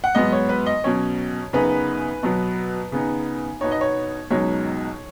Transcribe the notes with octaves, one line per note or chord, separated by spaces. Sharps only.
F#5
G#2 F#3 B3 D#5
C#5
B4
D#5
B2 F#3 C#4 C#5
F#2 C#3 B3 D#4 B4
B2 F#3 B3
C#3 B3 D#4
B2 B3 D#4 C#5
D#5
C#5
C#2 B2 F#3 D#4 C#5